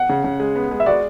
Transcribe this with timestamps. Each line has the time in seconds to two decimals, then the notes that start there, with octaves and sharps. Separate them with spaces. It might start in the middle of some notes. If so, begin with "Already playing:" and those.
Already playing: F#5
0.09 C#3
0.24 C#3
0.40 G#3
0.56 B3
0.71 G#3
0.80 E5
0.86 F#4 D5